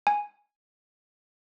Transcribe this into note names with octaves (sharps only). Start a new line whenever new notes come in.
G#5